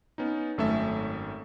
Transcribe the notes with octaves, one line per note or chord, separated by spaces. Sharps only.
B3 C#4 D#4
G#1 F#2 A3 C#4 A4 E5